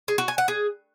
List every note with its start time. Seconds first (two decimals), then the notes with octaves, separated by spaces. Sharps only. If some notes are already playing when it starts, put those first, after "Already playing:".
0.08 G#4
0.18 F#4
0.28 G#5
0.38 F#5
0.48 G#4